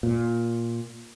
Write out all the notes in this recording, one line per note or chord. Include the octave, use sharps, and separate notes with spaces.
A#2